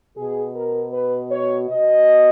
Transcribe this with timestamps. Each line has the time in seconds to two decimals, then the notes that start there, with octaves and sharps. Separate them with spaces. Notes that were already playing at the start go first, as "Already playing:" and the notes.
0.17 B2 G#4
0.55 A#4
0.93 B4
1.31 C#5
1.69 B2 D#5